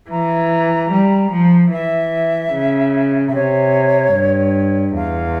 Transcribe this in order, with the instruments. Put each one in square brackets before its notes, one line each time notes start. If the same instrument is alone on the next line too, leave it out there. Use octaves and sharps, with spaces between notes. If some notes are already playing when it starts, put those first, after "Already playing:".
[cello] E3 [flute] A#5
[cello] G3
F3
[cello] E3 [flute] E5
[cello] C#3
[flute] E5
[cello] C3 [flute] C#5
[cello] G2
[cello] E2 [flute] F5